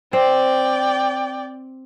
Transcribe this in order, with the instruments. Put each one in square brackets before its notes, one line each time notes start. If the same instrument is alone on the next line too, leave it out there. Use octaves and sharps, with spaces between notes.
[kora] C4 [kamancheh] D5 G5